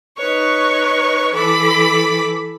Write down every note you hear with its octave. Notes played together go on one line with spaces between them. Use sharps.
D#4 B4 C#5 C#6
E3 A4 B5 D6